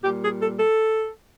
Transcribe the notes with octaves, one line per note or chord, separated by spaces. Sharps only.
A#2 G3 G4
G#4
A4
A4